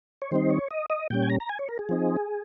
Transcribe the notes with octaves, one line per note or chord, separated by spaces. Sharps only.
C#5
D#3 G3 C4 D#4 C5
C#5
D#5
D#5
A#2 G3 C#4 G5
G#5
A#5
A#5
G#5
C#5
A#4
G#4
F3 C4 D#4